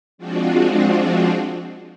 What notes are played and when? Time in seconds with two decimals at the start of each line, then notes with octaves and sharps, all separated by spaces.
0.18 F3 G#3 C4 D4 F4 F#4